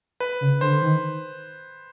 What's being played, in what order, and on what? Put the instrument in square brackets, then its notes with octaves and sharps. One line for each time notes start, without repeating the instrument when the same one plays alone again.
[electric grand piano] B4
[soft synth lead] C#3
[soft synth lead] D3 [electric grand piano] C5
[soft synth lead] D#3